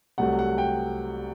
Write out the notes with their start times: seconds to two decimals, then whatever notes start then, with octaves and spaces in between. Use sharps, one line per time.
0.18 C2 C3 F#3 A3 F#5
0.39 F#5
0.58 G5